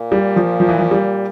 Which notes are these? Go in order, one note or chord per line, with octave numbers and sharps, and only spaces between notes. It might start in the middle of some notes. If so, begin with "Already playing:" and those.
Already playing: A#2
G3
F3
F3
E3
F3
G3